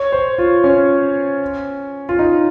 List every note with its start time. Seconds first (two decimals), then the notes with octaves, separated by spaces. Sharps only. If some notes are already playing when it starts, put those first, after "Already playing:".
Already playing: C#5
0.12 C5
0.38 F4
0.64 C#4
2.09 F4
2.19 D#4